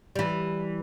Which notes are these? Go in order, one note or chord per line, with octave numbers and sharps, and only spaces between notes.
E3 G3